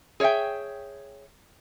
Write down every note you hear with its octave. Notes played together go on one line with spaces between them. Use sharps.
G#4 C#5 D5 E5 G5